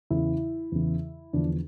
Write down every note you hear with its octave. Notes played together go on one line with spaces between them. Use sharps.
E2 C#3 E3 E4
E2 C#3 E3
E2 D3 F3 D4